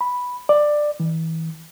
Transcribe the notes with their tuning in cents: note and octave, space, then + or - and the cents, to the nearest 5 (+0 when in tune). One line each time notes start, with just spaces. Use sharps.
B5 -5
D5 +15
E3 -30